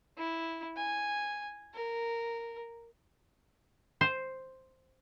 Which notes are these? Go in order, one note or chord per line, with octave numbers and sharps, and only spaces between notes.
E4
G#5
A#4
C5